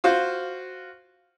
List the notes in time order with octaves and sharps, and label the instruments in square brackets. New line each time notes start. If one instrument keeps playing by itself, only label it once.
[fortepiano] F4 F#4 C5 F5